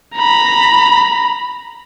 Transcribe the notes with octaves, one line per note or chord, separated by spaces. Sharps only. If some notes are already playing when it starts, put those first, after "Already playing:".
A#5 B5